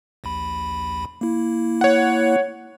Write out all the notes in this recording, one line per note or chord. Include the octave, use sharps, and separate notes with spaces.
A#1 D#2 B5
A#3 E4
C#5 F#5